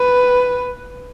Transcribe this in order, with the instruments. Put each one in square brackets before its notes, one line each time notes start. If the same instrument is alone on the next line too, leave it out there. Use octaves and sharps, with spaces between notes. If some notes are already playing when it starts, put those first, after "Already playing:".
Already playing: [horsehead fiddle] B4